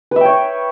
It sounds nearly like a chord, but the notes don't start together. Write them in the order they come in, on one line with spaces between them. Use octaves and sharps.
B4 E5 G5 C#5